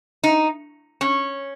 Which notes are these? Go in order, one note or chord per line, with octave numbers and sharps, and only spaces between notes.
D#4
C#4